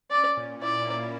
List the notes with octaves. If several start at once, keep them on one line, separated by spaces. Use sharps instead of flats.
C#4 D5
A#2
E4 D5
A#3